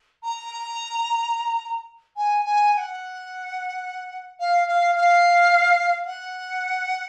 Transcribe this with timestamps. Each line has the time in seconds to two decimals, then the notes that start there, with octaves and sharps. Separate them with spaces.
0.23 A#5
2.17 G#5
2.45 G#5
2.73 G#5
2.78 F#5
4.40 F5
4.67 F5
4.95 F5
6.06 F#5